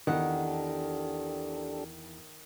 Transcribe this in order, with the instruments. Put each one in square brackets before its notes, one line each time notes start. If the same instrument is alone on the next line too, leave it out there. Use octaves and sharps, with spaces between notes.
[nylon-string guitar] E2 F#5 [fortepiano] D#3 [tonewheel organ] D4 G4 A4